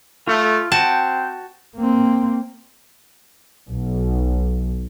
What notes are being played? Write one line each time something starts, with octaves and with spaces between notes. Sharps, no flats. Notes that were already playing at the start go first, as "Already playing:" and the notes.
A3 F4
C4 F#4 G5 A5
A#3 C4
B1